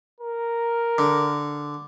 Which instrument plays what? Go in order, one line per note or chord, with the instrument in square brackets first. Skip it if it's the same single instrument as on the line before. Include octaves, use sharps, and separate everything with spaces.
[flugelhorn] A#4
[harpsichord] D3